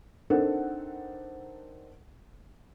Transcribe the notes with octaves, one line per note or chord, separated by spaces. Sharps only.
C4 D4 D#4 A4 A#4 F#5